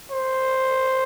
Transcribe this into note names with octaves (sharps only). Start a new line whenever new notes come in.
C5